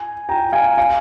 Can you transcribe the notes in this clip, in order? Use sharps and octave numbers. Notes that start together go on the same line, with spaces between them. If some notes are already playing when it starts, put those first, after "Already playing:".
Already playing: G#5
G5 A#5
F5 G#5
F5 G#5